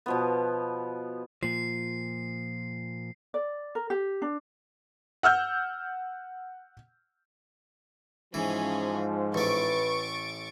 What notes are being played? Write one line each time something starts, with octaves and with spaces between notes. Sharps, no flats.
B2 F3 B3
A#2 F3 C7
D5
A#4
G4
D4
F#5 E6 F6 G6
G#2 E3 F3 C#4 G#4
A1 A3 B4 C#6 A6 D7